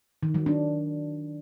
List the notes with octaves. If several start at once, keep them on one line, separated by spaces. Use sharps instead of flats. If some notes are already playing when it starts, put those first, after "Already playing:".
D#3
F#3
D4